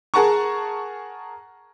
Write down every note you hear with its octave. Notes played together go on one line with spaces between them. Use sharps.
G#4 A#4 F#5 A5 A#5 C#6